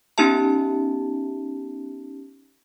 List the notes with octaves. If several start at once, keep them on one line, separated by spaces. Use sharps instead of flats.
B3 C#4 D#4 G4 E5 A5